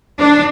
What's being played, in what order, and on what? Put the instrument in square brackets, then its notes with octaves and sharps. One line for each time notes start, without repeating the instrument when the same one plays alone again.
[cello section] D4